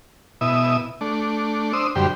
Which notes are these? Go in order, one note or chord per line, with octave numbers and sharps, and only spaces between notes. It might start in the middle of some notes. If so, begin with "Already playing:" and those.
B2 E4 E5 D#6
A3 D4
D4 C5 D#6 E6
F#2 D3 G3 G4 C5